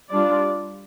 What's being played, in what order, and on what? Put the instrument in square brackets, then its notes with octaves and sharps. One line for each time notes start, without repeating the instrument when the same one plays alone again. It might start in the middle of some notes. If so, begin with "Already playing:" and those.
[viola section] G3 D4 F4 D5